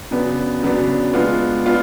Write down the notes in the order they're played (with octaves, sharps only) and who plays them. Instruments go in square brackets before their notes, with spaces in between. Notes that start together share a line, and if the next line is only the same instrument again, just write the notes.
[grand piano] C#3 F#3 B3 D4
C#3 F#3 B3 D4
G#3 B3 D4 F4
B3 D4 F4